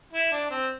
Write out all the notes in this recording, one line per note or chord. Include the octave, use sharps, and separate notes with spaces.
E4
D4
C4